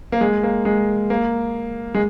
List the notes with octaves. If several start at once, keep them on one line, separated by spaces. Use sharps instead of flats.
A#3
G#3
A#3
G#3
A#3
G#3